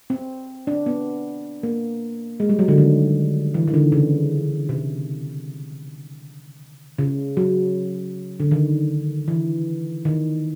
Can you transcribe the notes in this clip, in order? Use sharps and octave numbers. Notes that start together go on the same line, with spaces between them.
C4
D4
B3
A#3
G#3
G3
F#3
D3
D#3
E3
D#3
D3
C#3
C3
C#3
F#3
D3
D#3
E3
D#3